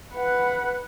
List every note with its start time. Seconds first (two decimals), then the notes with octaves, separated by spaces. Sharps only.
0.15 B4 F#5